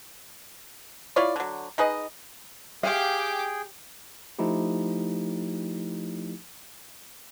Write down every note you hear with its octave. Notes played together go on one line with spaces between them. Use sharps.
E4 F4 C#5 D5
D3 F#3
D#4 G#4 B4 D#5
G4 G#4 F5 G5 D6
F3 A3 D#4 E4 G4